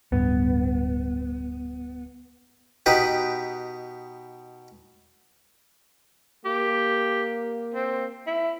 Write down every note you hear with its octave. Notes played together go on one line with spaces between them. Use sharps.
D1 G2 B3
B2 D#4 G4 B4
A#3 G4
C4
E4